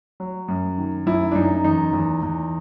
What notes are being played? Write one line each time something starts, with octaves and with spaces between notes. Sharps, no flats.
F#3
F#2
D#3
F#2 E4
D4
F#2 D#4
E2 D#4
E2
E2